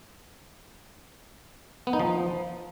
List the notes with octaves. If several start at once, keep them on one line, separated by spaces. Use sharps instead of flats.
B3
D#4
F3